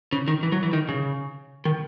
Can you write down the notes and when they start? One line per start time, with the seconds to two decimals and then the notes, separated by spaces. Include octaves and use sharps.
0.13 C#3
0.28 D#3
0.43 E3
0.52 F#3
0.63 E3
0.73 D#3
0.89 C#3
1.65 D#3